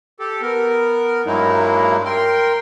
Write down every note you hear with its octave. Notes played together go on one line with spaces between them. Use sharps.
G4 A4
B3 A#4
G2 F#3 G#3 A#3 D#4 E4
A#4 G5 C6